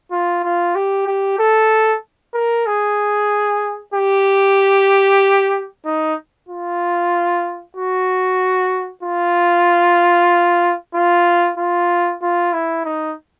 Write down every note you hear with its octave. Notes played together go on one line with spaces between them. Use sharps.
F4
F4
G4
G4
A4
A#4
G#4
G4
D#4
F4
F#4
F4
F4
F4
F4
E4
D#4